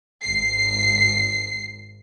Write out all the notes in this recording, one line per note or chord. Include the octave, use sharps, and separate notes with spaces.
G#1 C7